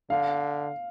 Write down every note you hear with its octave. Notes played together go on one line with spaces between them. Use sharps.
D3 F5